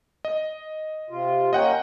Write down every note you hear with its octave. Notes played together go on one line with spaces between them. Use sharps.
D#5
C3 F4
A#3 C#4 D#5 F#5 G5